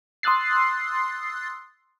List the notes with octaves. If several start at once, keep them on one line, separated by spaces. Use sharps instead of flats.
C6 D#6 E6 F#6 A6 C7